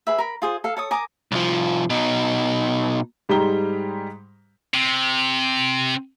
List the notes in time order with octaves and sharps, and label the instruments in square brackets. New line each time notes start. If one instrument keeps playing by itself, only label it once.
[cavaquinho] G#4 B4 E5
A#4 B5
F4 G#4 C5
A4 F5
A4 C#5 D#6
A#4 G#5 D6 D#6
[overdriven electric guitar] C2 F3
B2 D#4
[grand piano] G#2 G3 G#3 G4 A#5 G7
[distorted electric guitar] C3